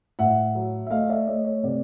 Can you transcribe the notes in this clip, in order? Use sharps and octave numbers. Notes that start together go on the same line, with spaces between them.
A2 E5 F#5
F#3
E5
A3 D#5 F5
D5 E5
A3 C#5 D#5
C#5
C3 D5